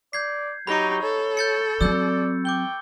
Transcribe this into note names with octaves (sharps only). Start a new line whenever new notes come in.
D5 G6 G#6 C7
F#3 D#4 G4 B5 C#6
A4 C#5
G6 A6 C#7
F#3 C4 D5 E6 G6
G5 D6 G6 G7